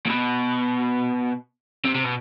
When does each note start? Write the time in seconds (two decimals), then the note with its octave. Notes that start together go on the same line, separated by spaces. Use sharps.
0.06 A#2
0.10 B2
1.85 C3
1.95 C3
2.04 B2